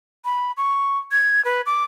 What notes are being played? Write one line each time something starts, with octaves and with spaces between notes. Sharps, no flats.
B5
C#6
G#6
B4
D6